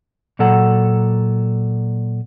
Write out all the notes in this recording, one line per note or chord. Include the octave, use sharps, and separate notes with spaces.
A#2 F#3 A4 F#5 A#5